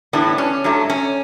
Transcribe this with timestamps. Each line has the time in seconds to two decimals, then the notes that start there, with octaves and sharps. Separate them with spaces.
0.13 A2 E3 G3 B3 D4
0.38 C#4
0.64 G2 F#3 A3
0.90 C#4